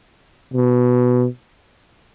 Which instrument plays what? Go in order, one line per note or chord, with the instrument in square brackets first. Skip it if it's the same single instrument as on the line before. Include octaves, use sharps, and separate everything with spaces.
[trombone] B2